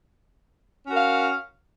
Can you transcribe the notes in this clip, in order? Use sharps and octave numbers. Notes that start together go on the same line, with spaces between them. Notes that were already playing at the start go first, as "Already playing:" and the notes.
C#4 F#4 A#4 F5